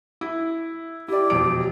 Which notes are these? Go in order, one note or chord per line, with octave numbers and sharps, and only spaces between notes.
E4
E4 G4 D5
E1 F2 D7